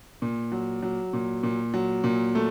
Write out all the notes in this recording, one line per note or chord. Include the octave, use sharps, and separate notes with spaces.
A#2
F#3
F#3
A#2
A#2
F#3
A#2
A3